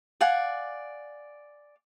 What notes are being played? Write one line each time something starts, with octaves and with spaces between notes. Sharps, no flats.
D5 F5 F#5 G#5